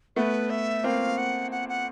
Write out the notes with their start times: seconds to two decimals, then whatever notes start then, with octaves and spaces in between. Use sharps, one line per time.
0.16 A3 B3 B4
0.50 E5
0.84 A#3 C4 F5
1.18 F#5
1.51 F#5
1.69 F#5